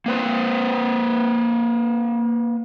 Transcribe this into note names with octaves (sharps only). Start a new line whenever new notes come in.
A#3 B4 C5